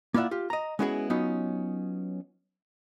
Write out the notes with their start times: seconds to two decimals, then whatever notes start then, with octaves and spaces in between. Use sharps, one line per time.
0.14 A#3 E4 F4 D5 E5 F#5
0.31 F4 G4
0.50 D#5 A#5
0.79 G#3 B3 C#4 E4 F#4 G#4
1.10 F#3 B3 C#4 D#4 F4